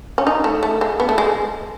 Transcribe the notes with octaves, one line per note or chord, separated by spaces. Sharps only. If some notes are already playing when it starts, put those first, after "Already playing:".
C#4
D#4
A3
A3
G#3
B3
A3
G#3